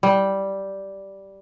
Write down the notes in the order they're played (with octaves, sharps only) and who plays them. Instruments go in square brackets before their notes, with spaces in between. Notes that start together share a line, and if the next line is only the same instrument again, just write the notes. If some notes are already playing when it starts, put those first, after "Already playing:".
[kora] G3